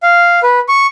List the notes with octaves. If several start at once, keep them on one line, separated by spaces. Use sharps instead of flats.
F5
B4
C#6